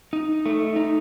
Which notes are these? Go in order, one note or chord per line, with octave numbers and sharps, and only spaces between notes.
D#4
A3
D#4